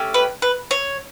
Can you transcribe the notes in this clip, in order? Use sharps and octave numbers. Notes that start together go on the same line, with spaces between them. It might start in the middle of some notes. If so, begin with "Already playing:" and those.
Already playing: A3 C#4 G4
B4
B4
C#5